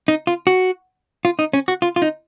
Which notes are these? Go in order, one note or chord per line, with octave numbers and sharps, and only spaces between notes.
D#4
F4
F#4
F4
D#4
C#4
F#4
F4
F4
D#4